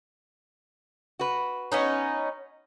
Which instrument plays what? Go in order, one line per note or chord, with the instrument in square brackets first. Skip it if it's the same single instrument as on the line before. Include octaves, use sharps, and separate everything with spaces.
[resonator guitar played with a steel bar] F#4 B4
[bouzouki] B3 C#4 D#4